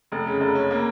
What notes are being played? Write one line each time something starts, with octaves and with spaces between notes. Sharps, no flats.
F1
C#3
F1
C#4
A#3